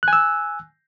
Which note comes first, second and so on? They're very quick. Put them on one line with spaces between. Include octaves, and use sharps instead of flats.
F#6 G#5 E6